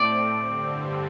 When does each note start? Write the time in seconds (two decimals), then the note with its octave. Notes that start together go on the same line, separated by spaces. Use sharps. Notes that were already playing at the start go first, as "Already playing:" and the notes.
Already playing: A2 A3 C4 D5
0.31 G2 D3 G3 C4